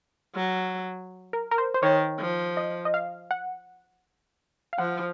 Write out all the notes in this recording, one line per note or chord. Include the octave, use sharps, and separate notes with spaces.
F#3
A#4
A#4
C5
C5
D#3 C#5
F3
D#5
D#5
F5
F#5
F5
F3 F#5